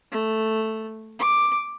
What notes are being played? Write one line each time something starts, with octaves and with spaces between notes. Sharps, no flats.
A3
D6